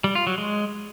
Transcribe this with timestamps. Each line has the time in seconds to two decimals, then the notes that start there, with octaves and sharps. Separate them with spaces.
0.04 G3
0.15 F4
0.27 F#3
0.38 G#3